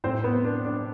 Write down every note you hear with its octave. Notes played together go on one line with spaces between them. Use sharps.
A2 C4 C5
B3
D4
D4